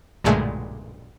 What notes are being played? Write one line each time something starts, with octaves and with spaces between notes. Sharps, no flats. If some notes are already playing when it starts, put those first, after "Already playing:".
B1 G2 A#2 D3 G#3 A3